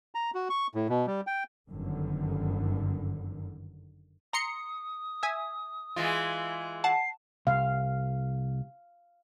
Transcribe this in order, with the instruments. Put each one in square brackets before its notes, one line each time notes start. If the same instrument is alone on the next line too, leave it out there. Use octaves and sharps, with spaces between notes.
[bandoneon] A#5
F#4
C#6
A2
B2
G3
G5
[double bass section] G1 F#2 D3 D#3
[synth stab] A#5 C6 C#7 [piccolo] D#6
[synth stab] E5 G#5
[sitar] E3 G#3 F4
[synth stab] F#5 A5 [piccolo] C7
[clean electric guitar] C2 [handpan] F5